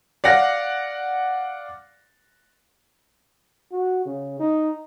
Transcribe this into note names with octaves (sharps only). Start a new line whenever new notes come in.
D5 F5 F#5 A#6
F#4
C#3
D#4